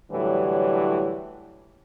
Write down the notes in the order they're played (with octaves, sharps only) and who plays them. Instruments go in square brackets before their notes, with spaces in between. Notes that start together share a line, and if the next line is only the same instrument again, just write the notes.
[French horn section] A2 D3 E3 F#3 G3